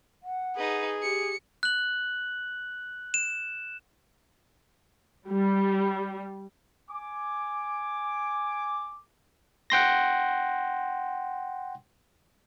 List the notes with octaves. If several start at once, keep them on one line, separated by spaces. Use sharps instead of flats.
F#5
D#4 G#4 B4
G4 C#7
F#6 F#7
E7
G3
G#5 D6
F#5 G5 C6 A#6